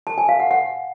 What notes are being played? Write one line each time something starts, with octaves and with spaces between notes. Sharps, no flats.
A5
G#5
F5
F#5
F#5